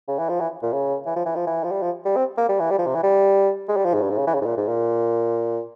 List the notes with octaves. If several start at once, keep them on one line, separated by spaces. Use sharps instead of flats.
C#3
E3
F3
E3
A#2
C#3
E3
F3
E3
F3
E3
F3
G3
F3
G3
C4
A#3
G3
E3
G3
F3
C3
E3
G3
G#3
G3
F3
G#2
G2
G#2
C#3
E3
C#3
G#2
A#2
G#2
A#2